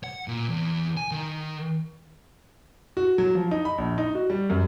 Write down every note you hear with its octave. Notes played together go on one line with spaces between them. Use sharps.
F#5
A#2
E2
G#5
D#3
F#4
F#3
F3
D#4
B5
A#1
D#4
F#4
G3
F#2